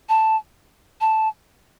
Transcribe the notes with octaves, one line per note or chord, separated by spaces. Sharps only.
A5
A5